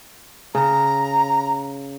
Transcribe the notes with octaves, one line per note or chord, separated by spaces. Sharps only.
C#3 A#5